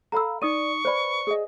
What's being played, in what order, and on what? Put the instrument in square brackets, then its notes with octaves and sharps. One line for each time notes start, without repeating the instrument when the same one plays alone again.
[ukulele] A4 F5 B5 [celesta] A#5 E6
[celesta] D#4 D#6 D#7 [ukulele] D5 [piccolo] C#6
[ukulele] B4 B5 [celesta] C5 D5
[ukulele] G#4 D#5